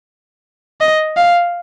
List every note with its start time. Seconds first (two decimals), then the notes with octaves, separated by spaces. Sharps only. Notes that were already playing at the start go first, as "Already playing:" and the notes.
0.81 D#5
1.17 F5